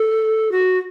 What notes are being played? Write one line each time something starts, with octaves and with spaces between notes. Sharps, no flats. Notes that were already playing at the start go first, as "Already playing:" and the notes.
Already playing: A4
F#4